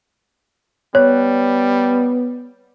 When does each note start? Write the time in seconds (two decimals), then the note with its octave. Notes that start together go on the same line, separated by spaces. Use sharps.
0.95 G3 B3 C#5